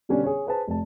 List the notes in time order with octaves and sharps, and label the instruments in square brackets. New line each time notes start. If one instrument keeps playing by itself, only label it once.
[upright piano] B2 D3 G3 B3 C#4 D4
G#4 C#5
G#4 B4 C5 A5
F1 A5